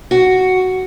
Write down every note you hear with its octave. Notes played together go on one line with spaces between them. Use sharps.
F#4